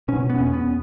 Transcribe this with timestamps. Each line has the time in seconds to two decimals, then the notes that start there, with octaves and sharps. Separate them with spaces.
0.08 B2 C#4
0.30 B3
0.38 E2 C#4
0.53 B3